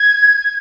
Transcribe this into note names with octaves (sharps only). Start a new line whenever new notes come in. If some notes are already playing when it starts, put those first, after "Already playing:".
Already playing: G#6